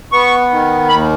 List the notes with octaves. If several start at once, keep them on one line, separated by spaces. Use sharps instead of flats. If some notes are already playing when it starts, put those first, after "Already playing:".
B3 C#6
D#3
D#2 B5